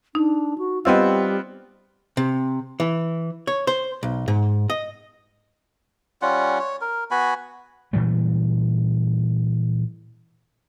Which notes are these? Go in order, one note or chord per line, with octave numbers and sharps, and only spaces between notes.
D4 D#4
F#4
G3 B3 C4 F4 D#5 E6
C3
E3
C#5
C5
B1
G#2
D#5
G3 C#4 F4 F#5
C#5
A#4
B3 F#4 G#5 B5
A#2 E3 G3 G#3